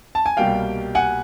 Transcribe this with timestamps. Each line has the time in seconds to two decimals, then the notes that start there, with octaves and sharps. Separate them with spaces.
0.15 A5
0.26 G#5
0.37 C2 B2 G3 A#3 F5 G5
0.95 F#5 G#5